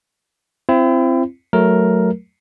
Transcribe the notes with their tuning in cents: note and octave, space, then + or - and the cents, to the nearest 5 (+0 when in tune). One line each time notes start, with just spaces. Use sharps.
C4 +0 E4 +40
F#3 +0 A3 -5 A#4 +5